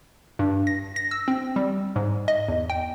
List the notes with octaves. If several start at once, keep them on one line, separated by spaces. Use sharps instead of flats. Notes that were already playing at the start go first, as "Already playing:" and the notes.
G2
A#6
A#6
E6
C4
G3
G#2
D#5
E2
G5